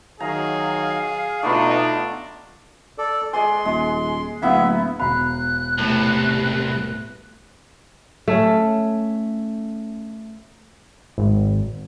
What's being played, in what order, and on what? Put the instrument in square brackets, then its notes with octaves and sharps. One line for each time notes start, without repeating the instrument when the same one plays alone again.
[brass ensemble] D#3 F#3 [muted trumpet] G#4 [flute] F5 [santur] A#5
[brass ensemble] B2 D#4 [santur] A3 B3 F4 [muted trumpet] D4
[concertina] A4 D5
[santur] G#3 D5 G#5 [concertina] C6
[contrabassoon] D#1 [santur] G#3
[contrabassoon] D1 [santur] A#3 B3 E4 [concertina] E5
[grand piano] E1 A#5 B5 [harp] F5 [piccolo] F#6
[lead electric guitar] C2 C3 [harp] A2 B4 A5
[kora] A3 C#4
[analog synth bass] G#1